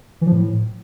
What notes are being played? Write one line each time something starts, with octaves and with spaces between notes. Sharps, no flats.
E3
F3
A2